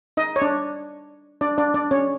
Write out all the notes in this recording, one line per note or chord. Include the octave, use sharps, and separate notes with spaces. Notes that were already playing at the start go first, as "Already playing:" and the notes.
D#4 D#5
C#5
D4 D5
D4 D5
D4 D5
D4 D5
C#4 C#5